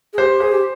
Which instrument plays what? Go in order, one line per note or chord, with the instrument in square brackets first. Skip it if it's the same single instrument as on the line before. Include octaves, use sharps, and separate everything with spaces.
[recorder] G#4
[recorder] G4 [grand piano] C5
[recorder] G#4 [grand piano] C5
[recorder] G4